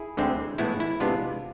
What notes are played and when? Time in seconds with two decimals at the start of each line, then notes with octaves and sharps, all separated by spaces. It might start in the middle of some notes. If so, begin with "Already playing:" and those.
Already playing: E4 G#4
0.17 D2 D3 G#3 C4
0.58 A2 E3 G#3 B3 E4
0.80 E4
1.00 C3 G#3 B3 D4 F4